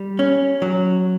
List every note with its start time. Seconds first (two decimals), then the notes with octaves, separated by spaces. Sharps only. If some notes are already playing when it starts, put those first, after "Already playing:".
Already playing: G3
0.19 C#4
0.62 F#3